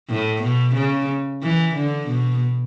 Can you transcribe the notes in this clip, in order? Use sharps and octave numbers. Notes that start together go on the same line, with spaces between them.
A2
B2
C#3
E3
D3
B2